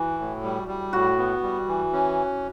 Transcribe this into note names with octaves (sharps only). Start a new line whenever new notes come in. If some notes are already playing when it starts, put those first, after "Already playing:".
Already playing: E3 E4 F#4
A2
G3
G3
A2 F#4
B3
G3
E3
C#4